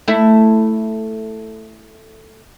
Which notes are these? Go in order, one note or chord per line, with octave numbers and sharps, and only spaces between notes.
A3 E4